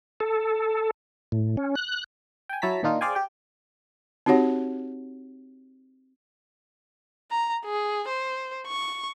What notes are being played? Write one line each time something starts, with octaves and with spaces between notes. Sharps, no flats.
A4
A2
C#4
F#6
G5 G#5
F#3 E4 C#5 A5 A#5 B6
A#2 D#3 D4 D#4 F4
G#4 C5 D5 F5 G5 G#5
G4 G5
C4 D#4 F#4 G4 C#5 F#5
A#5
G#4
C5
C#6